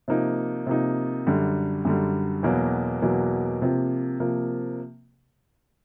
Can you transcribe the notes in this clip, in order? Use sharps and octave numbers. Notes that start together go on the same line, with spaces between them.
C3 F3 A#3 D#4
C3 F3 A#3 D#4
F#2 D3 G3
F#2 D3 G3
E2 B2 F#3 A#3
E2 B2 F#3 A#3
C3 F3 A#3
C3 F3 A#3